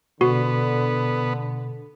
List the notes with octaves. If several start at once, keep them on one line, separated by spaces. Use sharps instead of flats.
B2 D3 B3 F#4